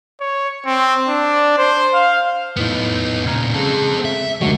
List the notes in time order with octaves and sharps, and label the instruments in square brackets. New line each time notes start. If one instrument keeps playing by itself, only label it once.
[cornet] C#5
C4
D4
C5
F5
[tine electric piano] E2 A2 [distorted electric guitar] B3 D#4
[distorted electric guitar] A#2 C#3 [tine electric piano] A#5 F6 G#6
[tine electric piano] C#3 [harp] G#3 [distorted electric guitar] C4 A4
[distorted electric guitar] E5
[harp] D#2 F#3 [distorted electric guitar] D3 [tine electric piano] G#3 A3 F#4